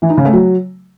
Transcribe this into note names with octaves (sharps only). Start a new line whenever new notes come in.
E3
D#4
C#3
A3
F#3